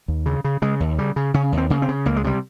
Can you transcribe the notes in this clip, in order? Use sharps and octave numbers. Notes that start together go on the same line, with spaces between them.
D#2
C#3
C#3
C#3 G#3
D#2
C#3 G3
C#3
C#3 C#4
D#2
C4
C#3 A#3
C4
C#3
C#2 A#3
G#3
C3 G3